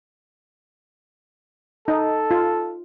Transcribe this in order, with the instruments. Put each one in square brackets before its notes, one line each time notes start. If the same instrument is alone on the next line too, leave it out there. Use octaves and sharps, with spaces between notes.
[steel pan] D#4 D#5 [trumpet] A4
[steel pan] F4